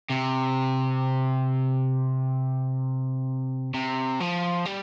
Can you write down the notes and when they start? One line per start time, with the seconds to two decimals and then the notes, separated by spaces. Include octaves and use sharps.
0.10 C3
3.74 C3
4.20 F3
4.66 G3